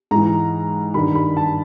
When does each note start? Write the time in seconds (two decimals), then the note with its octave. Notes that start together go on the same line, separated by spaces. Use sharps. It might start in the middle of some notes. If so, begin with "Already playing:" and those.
0.11 G#2 E3 A#5
0.94 G2 D#3 B5
1.15 B5
1.37 A5